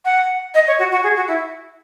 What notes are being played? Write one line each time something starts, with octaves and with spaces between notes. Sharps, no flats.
F#5
D#5
C#5
F#4
F#4
G#4
F#4
E4